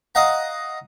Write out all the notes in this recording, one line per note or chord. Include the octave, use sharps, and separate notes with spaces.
D#5 F5 F#5 A#5